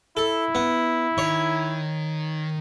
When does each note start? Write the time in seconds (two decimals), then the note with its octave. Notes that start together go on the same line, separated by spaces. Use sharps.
0.17 E4 A4
0.55 B3
1.18 D#3 C#5